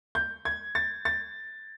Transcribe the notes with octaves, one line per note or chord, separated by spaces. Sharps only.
G6
G#6
A6
A6